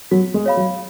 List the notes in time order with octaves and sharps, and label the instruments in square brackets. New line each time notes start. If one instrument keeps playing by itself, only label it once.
[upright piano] F#3 [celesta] F#4
[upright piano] G#3
[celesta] C#5 F5 B5
[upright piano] F#3